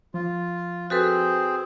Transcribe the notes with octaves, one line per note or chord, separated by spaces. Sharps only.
F3 F4
C4 F#4 G#4 A4 B4 C5